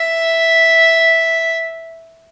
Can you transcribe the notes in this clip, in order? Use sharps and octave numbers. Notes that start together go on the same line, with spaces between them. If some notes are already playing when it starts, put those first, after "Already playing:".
Already playing: E5